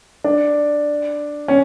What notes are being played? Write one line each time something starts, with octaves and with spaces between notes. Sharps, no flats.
D4
C#4